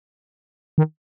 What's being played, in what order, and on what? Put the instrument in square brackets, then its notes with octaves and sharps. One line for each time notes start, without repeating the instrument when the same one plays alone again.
[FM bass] D#3